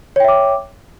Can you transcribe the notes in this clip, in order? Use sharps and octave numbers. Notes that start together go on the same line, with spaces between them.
C#5 E5 G5 D6